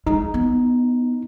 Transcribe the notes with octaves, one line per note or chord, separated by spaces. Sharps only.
G#3 D#4
B3